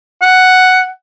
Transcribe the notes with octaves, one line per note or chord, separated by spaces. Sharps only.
F#5